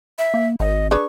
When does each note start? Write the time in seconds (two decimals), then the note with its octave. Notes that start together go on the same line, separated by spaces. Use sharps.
0.18 E5
0.34 A#3
0.60 G#1 D#5
0.91 D4 G#4 B4 C#6